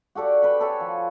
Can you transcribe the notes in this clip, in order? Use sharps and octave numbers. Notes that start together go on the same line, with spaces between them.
F#4 G4 A4 D5
B4 G5 B5
A4 C#5 E5 G#5
F3